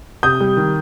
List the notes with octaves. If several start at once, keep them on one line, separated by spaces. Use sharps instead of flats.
C3 D#6 G6
G3
D#3